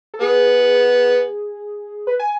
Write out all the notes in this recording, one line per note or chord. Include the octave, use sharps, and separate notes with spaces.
A4
B3 G#4
B4
G#5